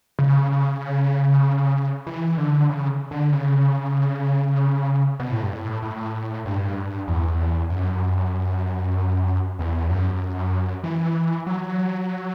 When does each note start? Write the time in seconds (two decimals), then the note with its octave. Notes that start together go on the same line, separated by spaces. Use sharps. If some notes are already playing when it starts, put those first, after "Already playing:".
0.19 C#3
2.07 E3
2.38 D3
2.69 C#3
3.11 D3
3.32 C#3
5.20 B2
5.31 A2
5.43 G2
5.53 A2
5.82 A2
6.46 G2
7.08 E2
7.70 F#2
9.59 E2
9.90 F#2
10.84 E3
11.47 F#3